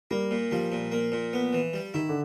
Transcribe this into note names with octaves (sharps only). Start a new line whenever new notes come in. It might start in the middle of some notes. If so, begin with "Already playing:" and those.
G3 A#3
A#2
F3 G3
A#2
A#3
A#2
B3
E3
G3
D#3 E4
D3